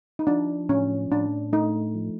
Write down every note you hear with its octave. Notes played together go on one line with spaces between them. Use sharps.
D#4
F3 D4
A2 C#4
A2 D4
A3 D#4
F3